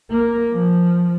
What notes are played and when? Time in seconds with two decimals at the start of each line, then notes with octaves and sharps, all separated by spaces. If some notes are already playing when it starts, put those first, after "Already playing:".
0.10 A#3
0.53 F3